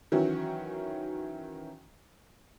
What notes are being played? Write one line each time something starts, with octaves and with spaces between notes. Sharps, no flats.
D#3 E3 F#3 C#4 F#4